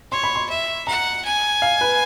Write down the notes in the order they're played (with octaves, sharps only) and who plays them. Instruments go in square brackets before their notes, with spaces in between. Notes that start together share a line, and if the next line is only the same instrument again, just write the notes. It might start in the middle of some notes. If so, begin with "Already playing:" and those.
[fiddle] C#5 [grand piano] C6
[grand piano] B5
C6
[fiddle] E5
[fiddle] F#5 [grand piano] A#5
[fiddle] G#5
[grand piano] F5
B4